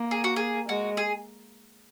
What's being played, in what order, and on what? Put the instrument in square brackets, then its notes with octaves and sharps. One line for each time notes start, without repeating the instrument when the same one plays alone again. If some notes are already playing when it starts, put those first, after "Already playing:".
Already playing: [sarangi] A#3
[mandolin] G#4
F#4
G#4
[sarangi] G#3 [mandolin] F#4
[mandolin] G#4